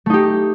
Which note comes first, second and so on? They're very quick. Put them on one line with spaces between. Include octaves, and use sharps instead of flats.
A3 D#4 G4